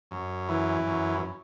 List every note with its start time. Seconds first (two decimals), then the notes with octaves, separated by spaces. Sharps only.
0.11 F#2
0.49 E3
0.87 F#2